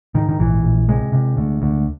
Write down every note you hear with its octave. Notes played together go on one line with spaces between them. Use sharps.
G#2 D#3
D#3
A#1 E3
A#1
C3 G#3
C3
D2
D2